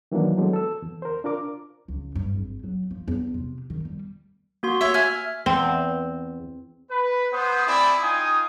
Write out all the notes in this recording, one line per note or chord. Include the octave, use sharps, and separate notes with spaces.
D#3 E3 F#3 A#3 D4
F#3 G#3 B3 A4
A4 E6
E2
A#4 C5
D4 F4 A#4 D6
C#2
G2
G#1
F#3
F3
E2
C3
D#3
G3
A#3 F#4 C6
C#5 E5
E5 G#5 F6
E2 C4
B4
B3 C5 D#6
C4 E4 G#4 D5 B5 D#6
D#4 F4 G5 G#5 D#6